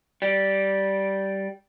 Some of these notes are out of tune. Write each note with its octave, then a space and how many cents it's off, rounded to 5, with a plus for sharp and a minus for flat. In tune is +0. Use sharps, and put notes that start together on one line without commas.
G3 -10